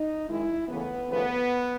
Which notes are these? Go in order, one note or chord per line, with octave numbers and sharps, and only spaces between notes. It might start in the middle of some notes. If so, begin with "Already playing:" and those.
Already playing: D#4
F#2 D#3 G#3 E4
D#2 C#3 E3 A3 B3
D#2 C#3 F3 A3 B3